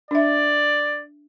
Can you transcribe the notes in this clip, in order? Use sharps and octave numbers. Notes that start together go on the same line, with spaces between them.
D4 D5 E5